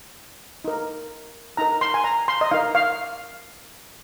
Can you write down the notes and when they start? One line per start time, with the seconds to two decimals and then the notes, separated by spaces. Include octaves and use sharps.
0.64 D#4 A#4
1.57 D#4 A#4 A#5
1.81 C6
1.94 G#5
2.04 A#5
2.28 C6
2.41 D#5
2.51 D#4 A#4 F5
2.75 F5